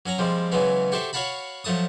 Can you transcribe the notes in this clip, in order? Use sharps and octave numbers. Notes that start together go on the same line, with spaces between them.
F#3 C#4 F#4 A#5
F3 G3 G#3 C4
C#3 E3 F#3 G#3 B3 C#4
F#4 G4 A4 C5 E5
F#4 C#5 F5 F#5 A5 B5
F3 F#3 A3 A5 D#6